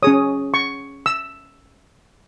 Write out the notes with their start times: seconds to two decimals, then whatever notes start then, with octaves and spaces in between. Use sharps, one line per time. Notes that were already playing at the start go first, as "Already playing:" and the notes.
0.02 C#4 G#4 C#5 D#6
0.54 C#6
1.06 E6